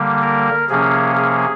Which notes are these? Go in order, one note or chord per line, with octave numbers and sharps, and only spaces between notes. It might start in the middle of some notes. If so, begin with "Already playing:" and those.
Already playing: D3 G3 A#3
A#4
C3 F3 A#3 C#4 G#4
G#4